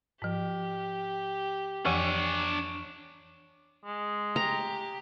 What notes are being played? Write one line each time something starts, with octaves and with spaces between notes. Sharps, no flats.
G#2 F3 G4
F2 E3 F3 D4 C#5 G#5
G#3
G4 A#5